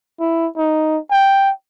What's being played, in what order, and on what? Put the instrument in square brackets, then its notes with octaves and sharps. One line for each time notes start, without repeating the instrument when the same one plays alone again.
[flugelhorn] E4
D#4
G5